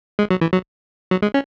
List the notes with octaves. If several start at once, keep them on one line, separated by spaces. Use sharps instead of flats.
G#3
F#3
E3
F#3
F#3
G#3
C#4